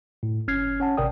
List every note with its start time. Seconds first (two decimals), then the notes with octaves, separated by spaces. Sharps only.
0.23 A2
0.48 G1 C#4 F6 G#6 C7
0.80 C#4 F#5 A5
0.97 G#1 C3 A#4 D5 G5 D#6